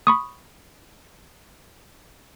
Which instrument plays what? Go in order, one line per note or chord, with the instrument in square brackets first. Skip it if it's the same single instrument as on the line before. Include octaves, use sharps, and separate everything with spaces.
[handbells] B5 C#6 D#6